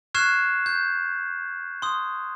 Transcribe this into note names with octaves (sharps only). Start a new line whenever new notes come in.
C#6 F6 F#6 G#6 C7 E7
G6
C6 D#6